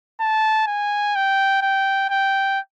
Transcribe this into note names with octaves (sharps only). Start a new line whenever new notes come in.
A5
G#5
G5
G5
G5